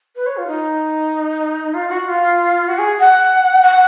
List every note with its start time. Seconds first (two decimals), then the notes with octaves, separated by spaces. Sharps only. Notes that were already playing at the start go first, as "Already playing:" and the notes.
0.16 B4
0.26 C#5
0.37 F4
0.47 D#4
1.74 F4
1.89 F#4
2.05 F#4
2.08 F4
2.69 F#4
2.79 G#4
3.00 F#5
3.63 F#5